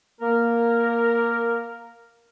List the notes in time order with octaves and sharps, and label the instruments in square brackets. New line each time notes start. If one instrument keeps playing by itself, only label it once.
[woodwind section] A#3 A#4